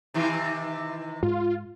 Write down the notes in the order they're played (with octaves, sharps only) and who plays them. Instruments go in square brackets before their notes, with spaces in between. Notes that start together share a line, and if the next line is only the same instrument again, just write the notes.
[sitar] C3 D#3 E3
[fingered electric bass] G#2 [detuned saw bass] F4